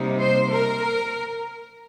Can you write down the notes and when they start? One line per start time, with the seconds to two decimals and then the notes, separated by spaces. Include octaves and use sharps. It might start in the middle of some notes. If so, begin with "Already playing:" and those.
Already playing: C3 G3 A#3 D#4
0.20 C5
0.52 A#4